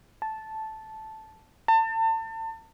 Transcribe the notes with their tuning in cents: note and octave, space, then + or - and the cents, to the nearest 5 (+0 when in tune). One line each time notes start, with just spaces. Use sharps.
A5 -5
A5 +35